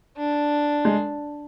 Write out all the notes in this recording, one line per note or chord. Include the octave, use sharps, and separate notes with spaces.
D4
G#3